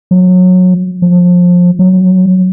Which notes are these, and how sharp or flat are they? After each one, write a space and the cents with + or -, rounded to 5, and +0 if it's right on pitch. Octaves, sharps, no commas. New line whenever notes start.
F#3 -20
F3 +25
F#3 +0